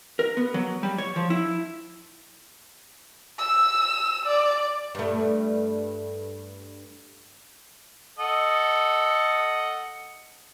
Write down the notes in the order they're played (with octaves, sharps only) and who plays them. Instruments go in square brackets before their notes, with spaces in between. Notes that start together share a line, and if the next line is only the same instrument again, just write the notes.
[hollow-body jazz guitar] A#4
B3
F#3
G3
C#5
F3
E4
[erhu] E6
D5
[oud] G2 A3
[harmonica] A4 D#5 F#5